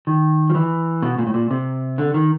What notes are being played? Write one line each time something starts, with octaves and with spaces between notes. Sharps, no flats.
D#3
F3
E3
B2
A#2
A2
A#2
C3
D3
D#3